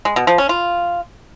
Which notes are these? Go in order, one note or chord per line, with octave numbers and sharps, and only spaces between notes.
G#3
B2
F3
C#4
F4